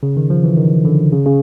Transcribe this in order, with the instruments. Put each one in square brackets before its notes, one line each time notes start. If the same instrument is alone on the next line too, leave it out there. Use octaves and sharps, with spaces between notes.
[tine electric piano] C#3
D#3
F3
E3
D#3
D3
C#3
C#3